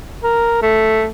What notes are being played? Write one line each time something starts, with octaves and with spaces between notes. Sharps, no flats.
A#4
A3